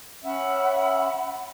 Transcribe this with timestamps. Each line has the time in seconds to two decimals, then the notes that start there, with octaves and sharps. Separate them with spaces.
0.24 C#4 E5 F#5 B5